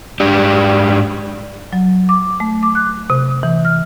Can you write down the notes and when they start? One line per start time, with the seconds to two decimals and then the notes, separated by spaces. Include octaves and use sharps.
0.20 G#2 D4 G4
1.73 F#3
2.09 D6
2.40 A3
2.63 D6
2.75 F#6
3.10 C3
3.43 E3
3.65 F6